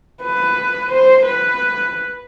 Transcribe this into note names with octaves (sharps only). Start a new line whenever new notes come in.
B4
C5
B4